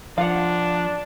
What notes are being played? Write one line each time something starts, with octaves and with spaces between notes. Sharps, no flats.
F3 D4 F5 F#5